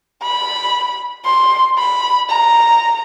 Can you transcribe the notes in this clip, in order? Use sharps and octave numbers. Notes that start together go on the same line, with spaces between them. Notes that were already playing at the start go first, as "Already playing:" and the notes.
B5
C6
B5
A#5